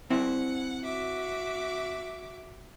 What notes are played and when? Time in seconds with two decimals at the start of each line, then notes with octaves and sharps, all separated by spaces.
0.10 C4 E4 F#5
0.83 F#4 E5 D6